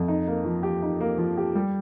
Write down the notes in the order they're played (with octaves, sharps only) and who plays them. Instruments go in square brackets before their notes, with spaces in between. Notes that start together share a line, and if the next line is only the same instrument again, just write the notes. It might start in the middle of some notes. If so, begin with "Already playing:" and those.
Already playing: [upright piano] F2
D#4
A#3
F3
G4
D#4
A#3
F3
G4
G3